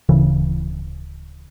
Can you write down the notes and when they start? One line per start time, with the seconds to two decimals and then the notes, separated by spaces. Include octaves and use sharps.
0.09 D1 C#3 E3